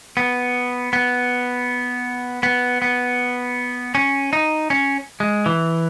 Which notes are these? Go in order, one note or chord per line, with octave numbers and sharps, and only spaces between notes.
B3
B3
B3
B3
C#4
D#4
C#4
G#3
E3